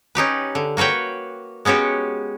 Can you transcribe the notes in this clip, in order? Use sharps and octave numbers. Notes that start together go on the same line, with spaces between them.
C#4 D#4 G4 B4
D3
A#3 F#4 B4 C#5 G5
G#3 B3 C#4 F#4 G4